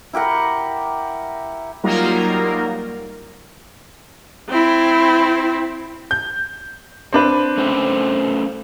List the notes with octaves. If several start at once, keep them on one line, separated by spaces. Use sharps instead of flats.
E4 G4 A#4 F#5
F#3 G3 A#3 D#4 F4 A#4
C4 E4
G6
C4 D4 B4
A3 C#4 C5